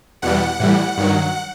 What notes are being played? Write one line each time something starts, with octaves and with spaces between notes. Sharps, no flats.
E2 B2 G3 F#5
A2 E3 G3
G2 D#3 F#3